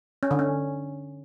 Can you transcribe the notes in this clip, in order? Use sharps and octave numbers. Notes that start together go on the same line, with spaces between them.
C#4
D3
C#4